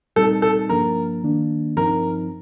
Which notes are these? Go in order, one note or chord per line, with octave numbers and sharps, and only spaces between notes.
A#2 G3 C4 D#4 A4
A4
G2 F3 A#3 D4 A#4
D#3 A#3 D4
G2 F3 C4 D#4 A#4